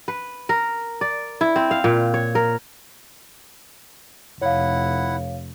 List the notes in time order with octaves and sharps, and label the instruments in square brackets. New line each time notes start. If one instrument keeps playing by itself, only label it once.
[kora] B4
A#4
D5
E4
C4
F5
A#2
C#5
A#4
[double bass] F1 [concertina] E4 F#5 [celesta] C#5 F5